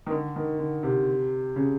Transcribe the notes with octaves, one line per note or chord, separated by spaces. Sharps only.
D#3
D3
D#3
D3
C3
C#3